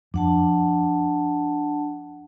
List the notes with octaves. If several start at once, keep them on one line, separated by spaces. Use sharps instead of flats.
F2 D4 F#5 A5